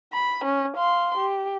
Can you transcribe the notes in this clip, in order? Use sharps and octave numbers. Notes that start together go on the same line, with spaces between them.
B5
C#4
F5 C6
G4